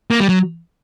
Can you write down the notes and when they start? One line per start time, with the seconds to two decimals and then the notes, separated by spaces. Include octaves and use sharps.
0.11 A#3
0.20 G3
0.29 F#3